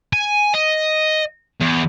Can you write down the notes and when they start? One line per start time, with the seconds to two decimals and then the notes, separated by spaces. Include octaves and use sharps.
0.13 G#5
0.54 D#5
1.61 E2